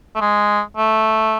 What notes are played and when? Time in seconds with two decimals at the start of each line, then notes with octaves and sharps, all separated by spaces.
0.15 A3
0.21 G#3
0.77 A3